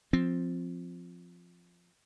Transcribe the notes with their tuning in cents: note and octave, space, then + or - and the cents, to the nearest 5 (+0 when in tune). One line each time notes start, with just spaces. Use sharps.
F3 +5 C4 +0